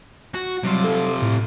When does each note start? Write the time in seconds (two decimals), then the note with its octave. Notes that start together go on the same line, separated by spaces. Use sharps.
0.34 F#4
0.63 C3 F#3 G3 F4
0.84 A4
1.22 A2